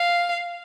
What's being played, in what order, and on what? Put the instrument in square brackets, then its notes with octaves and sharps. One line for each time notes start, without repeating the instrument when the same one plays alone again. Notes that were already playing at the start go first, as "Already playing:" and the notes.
Already playing: [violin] F5